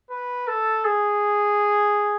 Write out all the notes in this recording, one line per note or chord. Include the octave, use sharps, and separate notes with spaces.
B4
A4
G#4